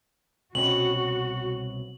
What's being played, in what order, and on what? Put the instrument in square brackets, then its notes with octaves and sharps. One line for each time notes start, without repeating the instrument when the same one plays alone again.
[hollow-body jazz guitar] C2 B2 C#4 [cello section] F#4 [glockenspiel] F#7